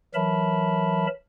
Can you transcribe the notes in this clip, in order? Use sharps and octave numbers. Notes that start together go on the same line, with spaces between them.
E3 F#3 A#4 E5 A5 B5